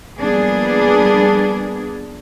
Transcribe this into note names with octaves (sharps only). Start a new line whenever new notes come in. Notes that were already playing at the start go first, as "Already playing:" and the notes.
F3 G3 A#3 B3 D4 G#4